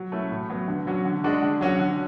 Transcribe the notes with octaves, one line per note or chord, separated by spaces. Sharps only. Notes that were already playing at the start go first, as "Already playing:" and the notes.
Already playing: F#3
A3 C#4 E4
A2
F#3 B3
D3
F#3 C#4 F#4
D3
G#3 D4 F#4
D3
F#3 C#4 F#4
D3